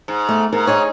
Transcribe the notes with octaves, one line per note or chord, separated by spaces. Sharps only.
G#2
A3
G#2 A#4
D#4 G#4 C#5